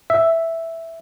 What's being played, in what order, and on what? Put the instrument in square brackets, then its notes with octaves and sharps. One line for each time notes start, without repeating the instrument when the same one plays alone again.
[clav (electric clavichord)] E5